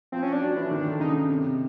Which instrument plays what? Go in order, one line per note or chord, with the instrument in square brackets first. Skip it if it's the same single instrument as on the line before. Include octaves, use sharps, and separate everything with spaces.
[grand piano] F3 [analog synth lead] C4
[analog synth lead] C#4
D4
[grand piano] F#3
E3
D#3
D3
[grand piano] C#3 [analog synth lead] D#4
[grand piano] C3